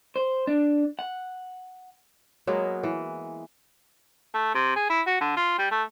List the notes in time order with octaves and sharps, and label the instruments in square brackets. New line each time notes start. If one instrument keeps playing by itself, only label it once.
[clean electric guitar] C5
D4
F#5
[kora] F#3 G#3 A#3 B3
E3
[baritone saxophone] A3
C3
G#4
E4
F#4
D3
F4
G3
A3